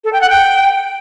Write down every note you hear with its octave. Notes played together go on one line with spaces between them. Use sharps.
A4
G5
F#5
G5